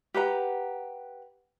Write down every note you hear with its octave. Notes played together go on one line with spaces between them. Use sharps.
G4 B4 F#5 A#5